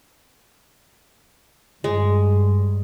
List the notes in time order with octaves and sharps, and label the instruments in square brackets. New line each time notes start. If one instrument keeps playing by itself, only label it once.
[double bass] G2 [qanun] G#3